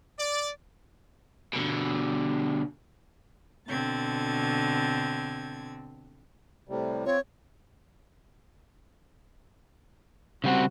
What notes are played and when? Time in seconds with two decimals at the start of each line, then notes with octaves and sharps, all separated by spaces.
0.19 D5
1.53 B2 D3
3.67 B2 D3 C4 G#6 A6
6.69 A2 C3 G3
7.06 C4 F4 C#5
10.44 C#3 G3 C4 F#4